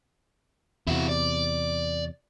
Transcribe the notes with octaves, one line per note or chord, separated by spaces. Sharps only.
E2 C3 E4 F#4
D5